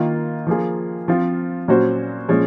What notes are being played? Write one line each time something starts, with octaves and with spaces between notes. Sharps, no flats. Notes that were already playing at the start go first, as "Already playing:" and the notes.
Already playing: D#3 A#3 F4
F3 A#3 F4 G#4
F3 C4 F4
A#2 F#3 C#4 F#4 C5
A#2 F3 G#3 C#4